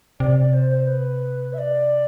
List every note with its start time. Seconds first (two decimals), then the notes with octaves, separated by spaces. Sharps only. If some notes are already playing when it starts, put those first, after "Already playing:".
0.20 C3 D5
0.37 D5
0.53 C5
0.70 C5
0.87 B4
1.53 E5
1.58 D5